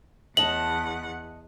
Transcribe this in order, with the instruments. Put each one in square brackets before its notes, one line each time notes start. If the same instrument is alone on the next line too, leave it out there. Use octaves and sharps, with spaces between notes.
[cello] E2 F#5 [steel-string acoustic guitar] D#5 A5 [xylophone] F#7